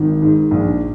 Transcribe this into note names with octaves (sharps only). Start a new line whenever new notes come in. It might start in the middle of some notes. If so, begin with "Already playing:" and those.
Already playing: G#1 D#3
G#2
A#1